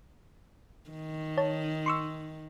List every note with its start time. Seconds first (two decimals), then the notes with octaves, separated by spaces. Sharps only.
0.90 D#3
1.37 C#5 A5
1.86 C6 C#6 E6